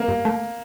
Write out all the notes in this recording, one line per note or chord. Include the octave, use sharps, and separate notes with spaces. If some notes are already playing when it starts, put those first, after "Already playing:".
Already playing: A#3
G2
A3